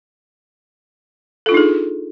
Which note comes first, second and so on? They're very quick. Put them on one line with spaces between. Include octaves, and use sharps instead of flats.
A4 F4 D4 D#4 G#4